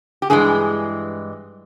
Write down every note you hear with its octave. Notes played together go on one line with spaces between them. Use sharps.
G4
G2 E3 G#3 G#4